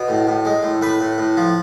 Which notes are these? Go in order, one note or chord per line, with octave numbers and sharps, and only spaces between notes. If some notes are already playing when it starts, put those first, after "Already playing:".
Already playing: B2 C#5
A2
A2
G#3
A2
A2 B4
A2
A2
F3